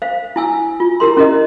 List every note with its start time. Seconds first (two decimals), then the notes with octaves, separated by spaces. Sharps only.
0.02 C5 F5
0.36 E4 G#5 E6
0.80 F4
1.00 E4 G4 A#4 C6
1.17 C#4 E4 A#4 D#5